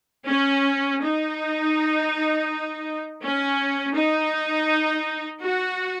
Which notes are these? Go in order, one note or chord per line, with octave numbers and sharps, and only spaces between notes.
C#4
D#4
C#4
D#4
F#4